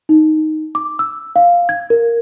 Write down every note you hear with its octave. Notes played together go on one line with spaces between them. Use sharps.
D#4
D6
E6
F5
G#6
A#4